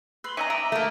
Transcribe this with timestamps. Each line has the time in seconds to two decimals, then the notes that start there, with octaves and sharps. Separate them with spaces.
0.24 B4 C6 E6 F#7 G7
0.37 C#4 D#4 E5 A#5 D#6 D#7
0.50 E5 A#5 D6 B6 D7
0.72 A3 A#3